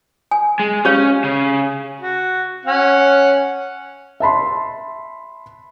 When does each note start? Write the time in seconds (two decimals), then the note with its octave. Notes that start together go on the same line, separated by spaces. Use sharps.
0.31 G#5
0.60 G#3
0.85 C#4 G4 C#5 F5
1.24 C#3
2.00 F#4
2.66 C#4 F#5
4.20 E5 A5 B5 C6